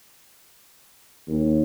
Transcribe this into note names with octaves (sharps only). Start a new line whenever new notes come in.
D#2